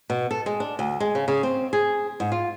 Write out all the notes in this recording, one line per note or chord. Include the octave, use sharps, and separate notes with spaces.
B2
A4
G#3
D4
D2
G#3
C#3
C#3
C4
G#4
G#2
F4